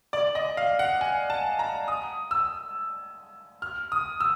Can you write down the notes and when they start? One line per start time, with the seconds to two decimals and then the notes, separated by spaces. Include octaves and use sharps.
0.13 D5
0.35 D#5
0.57 F5
0.79 F#5
1.01 G#5
1.30 A5
1.59 A#5
1.88 D#6
2.31 E6
3.62 F6
3.92 D#6
4.20 E6